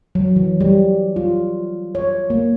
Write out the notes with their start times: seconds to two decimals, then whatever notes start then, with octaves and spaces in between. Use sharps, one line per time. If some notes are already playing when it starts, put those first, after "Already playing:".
0.15 F#3
0.36 E3
0.61 G3
1.16 F4
1.95 C#5
2.30 A#3